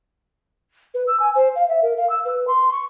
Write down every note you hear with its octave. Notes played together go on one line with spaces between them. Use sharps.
B4
E6
G#5
C5
F5
E5
A#4
F5
E6
B4
C6
C#6